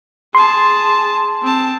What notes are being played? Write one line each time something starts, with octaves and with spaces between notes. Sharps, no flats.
G#4 A5 C6
C4 A5